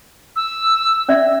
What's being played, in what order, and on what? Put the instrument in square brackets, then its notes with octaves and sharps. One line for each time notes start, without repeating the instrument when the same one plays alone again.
[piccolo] E6
[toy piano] C#4 D5 E5